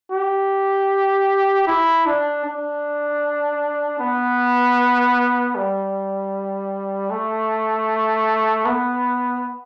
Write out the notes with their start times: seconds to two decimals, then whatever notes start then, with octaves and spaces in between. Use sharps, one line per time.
0.12 G4
1.67 E4
2.06 D4
2.45 D4
4.00 B3
5.55 G3
7.10 A3
8.65 B3